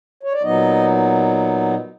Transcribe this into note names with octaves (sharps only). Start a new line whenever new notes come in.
C#5
D5
A#2 F#3 B3 D#4 D#5